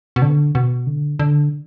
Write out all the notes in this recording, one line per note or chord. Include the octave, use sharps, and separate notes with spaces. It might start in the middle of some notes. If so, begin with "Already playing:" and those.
B2
D3
B2
D3
D3